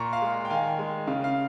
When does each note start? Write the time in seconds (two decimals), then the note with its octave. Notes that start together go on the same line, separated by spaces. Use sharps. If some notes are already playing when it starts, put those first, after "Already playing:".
Already playing: A#2 A#5 C#6
0.13 F5
0.22 G#3
0.45 G5
0.50 D#3 F5 G#5
0.79 G#3
1.07 C#3 F5
1.24 F5